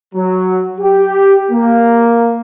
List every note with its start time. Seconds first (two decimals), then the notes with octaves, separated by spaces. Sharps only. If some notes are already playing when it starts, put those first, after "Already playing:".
0.15 F#3
0.79 G4
1.51 A#3